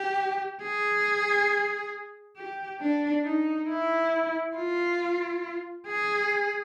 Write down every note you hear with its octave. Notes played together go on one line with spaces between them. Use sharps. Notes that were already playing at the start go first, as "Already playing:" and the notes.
Already playing: G4
G#4
G4
D4
D#4
E4
F4
G#4